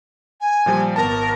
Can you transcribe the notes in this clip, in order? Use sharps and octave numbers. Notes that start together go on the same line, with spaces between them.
G#5
A#2 F3 G3
G#1 B3 A#4 A5